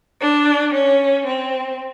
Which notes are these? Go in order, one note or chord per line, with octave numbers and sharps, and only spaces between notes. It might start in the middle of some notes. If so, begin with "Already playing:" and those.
D4
C#4
C4